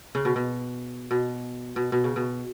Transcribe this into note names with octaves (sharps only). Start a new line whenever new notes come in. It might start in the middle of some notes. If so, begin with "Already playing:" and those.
C#3
B2
B2
B2
B2
B2
C#3
B2